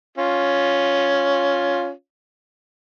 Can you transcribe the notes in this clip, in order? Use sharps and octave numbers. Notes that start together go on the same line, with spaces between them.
C#4 F4